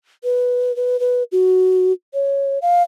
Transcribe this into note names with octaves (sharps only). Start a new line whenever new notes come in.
B4
B4
B4
F#4
C#5
F5